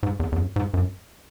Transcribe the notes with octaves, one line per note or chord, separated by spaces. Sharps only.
G#2
E2
E2
F#2
G#2
F#2